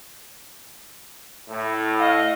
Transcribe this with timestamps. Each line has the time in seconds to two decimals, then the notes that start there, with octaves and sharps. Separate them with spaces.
1.49 A2
2.00 D#5 F5